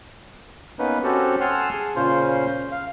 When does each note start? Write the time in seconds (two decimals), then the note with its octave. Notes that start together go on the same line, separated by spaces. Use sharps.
0.79 A#3 B3 C#4 D#4 B4
1.04 C4 C#4 F#4 G4 A4
1.41 F#5 G#5 A5 C6 E6 F6
1.73 G#4
1.96 A#2 C#3 C#4 F4 C5 C6
2.72 F5